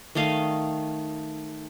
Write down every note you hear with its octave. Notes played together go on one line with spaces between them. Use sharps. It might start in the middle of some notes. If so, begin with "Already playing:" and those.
D#3 A3 D#5 F5